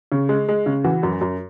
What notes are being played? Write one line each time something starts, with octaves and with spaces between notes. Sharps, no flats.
C#3
G#3
G#3
C#3
E3 F#4
F#2
F#2